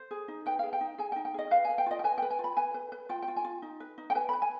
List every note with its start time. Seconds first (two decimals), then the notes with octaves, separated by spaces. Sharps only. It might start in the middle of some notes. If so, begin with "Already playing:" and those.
Already playing: C5
0.11 G#4
0.28 D#4
0.46 B4 G5
0.59 G#4 F5
0.73 G5
0.81 D#4
0.98 G#4 G#5
1.12 G5
1.16 D#4
1.25 G5
1.34 G#4 D#5
1.51 B4 F5
1.65 B4 G#5
1.78 G5
1.86 F4 D#5
1.99 G5
2.04 B4 G#5
2.18 B4 G5
2.31 G#5
2.39 F4
2.44 B5
2.57 B4 G#5
2.74 B4
2.92 B4
3.09 F4 G5
3.22 G5
3.28 F4
3.36 G#5
3.45 F4
3.62 D#4
3.80 B4
3.98 D#4
4.10 G5
4.15 B4 G#5
4.29 B4 B5
4.42 G#5